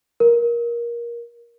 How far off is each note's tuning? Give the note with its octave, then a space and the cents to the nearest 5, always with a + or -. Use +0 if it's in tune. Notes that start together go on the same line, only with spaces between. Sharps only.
A#4 +20